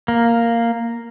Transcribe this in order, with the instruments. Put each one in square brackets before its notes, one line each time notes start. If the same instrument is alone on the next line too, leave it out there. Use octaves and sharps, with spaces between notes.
[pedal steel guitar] A#3